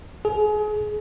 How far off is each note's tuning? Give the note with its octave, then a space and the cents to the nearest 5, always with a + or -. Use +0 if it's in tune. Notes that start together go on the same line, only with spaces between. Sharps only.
G#4 +30